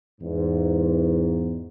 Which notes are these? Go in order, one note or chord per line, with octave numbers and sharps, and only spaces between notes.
E2 G#2